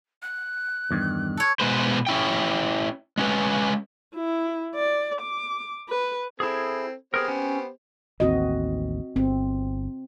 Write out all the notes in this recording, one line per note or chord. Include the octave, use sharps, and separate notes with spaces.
F#6
E2 G2 D#3
A4 C#5
B2 G#3 B4 C5
C#4 E4 G5
G#3 C#4 B4
E4
D5
D6
B4
C4 E4 G#4 A4
B3 G4 G#4 A#4 C5
C#4
A1 D#2 C4 F#4 D#5
G1 C4